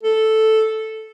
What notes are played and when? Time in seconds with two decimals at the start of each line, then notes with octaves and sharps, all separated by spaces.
0.03 A4